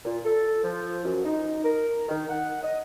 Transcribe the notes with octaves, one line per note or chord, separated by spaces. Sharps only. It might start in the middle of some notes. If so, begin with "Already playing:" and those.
A#2
A4
F3
F#2
D#4
A#4
D#3
F#5
D#5